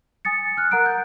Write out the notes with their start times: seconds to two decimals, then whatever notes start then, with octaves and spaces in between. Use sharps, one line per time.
0.25 G#5 D#6 A6 C#7
0.57 F6 F#6
0.71 A#4 F#5 A#5 F#6 D7
0.86 G6